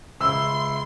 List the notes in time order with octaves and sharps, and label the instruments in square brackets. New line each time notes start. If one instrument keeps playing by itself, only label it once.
[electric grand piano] C#2 [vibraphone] E5 B5 [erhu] C6 [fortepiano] E6